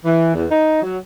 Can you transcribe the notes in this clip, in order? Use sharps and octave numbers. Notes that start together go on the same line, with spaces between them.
E3
E2
D#4
F#3